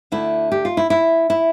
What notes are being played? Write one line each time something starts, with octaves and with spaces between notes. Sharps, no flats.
D2 D3 A3 E4
G4
F4
E4
E4
E4